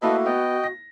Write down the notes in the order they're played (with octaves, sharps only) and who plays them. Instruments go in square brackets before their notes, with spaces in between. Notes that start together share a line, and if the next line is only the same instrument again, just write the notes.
[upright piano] A3 A#3 E4 [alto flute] F#4 [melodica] A4 B4 D#5
[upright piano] B3 [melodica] D#5 G5
[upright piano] A#6